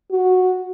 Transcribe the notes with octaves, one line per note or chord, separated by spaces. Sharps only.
F#4